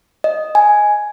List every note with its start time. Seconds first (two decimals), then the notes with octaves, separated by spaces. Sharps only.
0.24 D#5
0.55 G#5